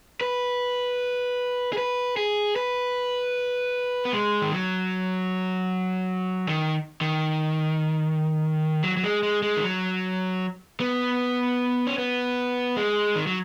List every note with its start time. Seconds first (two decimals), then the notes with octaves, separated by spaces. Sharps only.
0.21 B4
1.73 G#4
1.78 B4
2.17 G#4
2.56 B4
4.05 B3
4.13 G#3
4.42 D#3
4.52 F#3
6.48 D#3
7.01 D#3
8.84 F#3
8.97 F#3
9.04 G#3
9.23 G#3
9.42 G#3
9.57 D#3
9.63 F#3
10.80 B3
11.87 C#4
11.98 B3
12.77 G#3
13.16 D#3
13.27 F#3